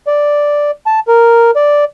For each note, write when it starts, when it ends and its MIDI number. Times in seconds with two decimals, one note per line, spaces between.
0.07 0.71 74
0.86 1.00 81
1.08 1.51 70
1.56 1.84 74